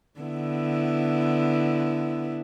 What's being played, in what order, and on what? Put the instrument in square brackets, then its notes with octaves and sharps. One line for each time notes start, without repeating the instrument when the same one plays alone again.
[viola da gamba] D3 B3 E4